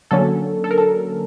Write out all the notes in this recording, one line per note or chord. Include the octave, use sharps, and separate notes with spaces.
D3 F#3 A#3 C#4 A4
A4
A#4
A4